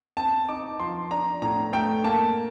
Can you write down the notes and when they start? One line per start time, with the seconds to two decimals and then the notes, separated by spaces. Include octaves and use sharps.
0.17 C4 A5
0.49 D#4 D6
0.80 F3 C6
1.11 D4 A#5
1.42 A2 A#5
1.73 A3 G5
2.04 A#3 A5